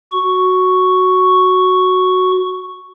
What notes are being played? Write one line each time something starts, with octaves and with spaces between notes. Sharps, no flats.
F#4 C#6